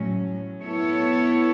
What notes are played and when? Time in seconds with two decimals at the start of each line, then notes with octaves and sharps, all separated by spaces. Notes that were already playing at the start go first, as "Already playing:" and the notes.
Already playing: A2 F#3 C#4
0.62 B3 E4 A4 C#5